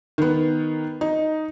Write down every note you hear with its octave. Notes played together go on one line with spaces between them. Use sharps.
D#3 B3
D#4